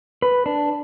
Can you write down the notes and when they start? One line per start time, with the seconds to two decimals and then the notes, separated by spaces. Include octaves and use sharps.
0.22 B4
0.46 D4